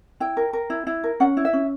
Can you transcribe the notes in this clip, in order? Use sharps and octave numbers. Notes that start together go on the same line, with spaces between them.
E4 G5
A#4
A#4
E4
E4
A#4
C#4 F#5
E4
E5
C#4